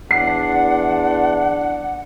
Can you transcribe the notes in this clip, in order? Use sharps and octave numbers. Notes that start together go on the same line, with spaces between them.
E2 D4 F#5 C7